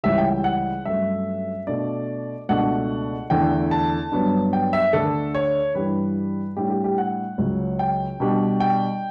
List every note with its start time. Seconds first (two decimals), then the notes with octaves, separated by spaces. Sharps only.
0.04 C#2 C#3 E3 G3 E5
0.18 G5
0.31 G5
0.44 F#5
0.85 G2 F#3 A3 C#4 E5
1.67 B2 A3 D4 D5
2.49 C#2 B2 A3 D4 F#5
3.30 E2 D3 A3 G5
3.71 A5
4.12 G2 F#3 B3 D4
4.53 G5
4.73 E5
4.93 D2 D3 A3 D4 A4
5.35 C#5
5.75 G2 E3 G3 D4 B4
6.57 A2 G3 D4 G4
6.70 G4
6.84 G4
6.98 F#5
7.38 C#2 C#3 F#3
7.79 G5
8.20 B2 G3 D4
8.60 G5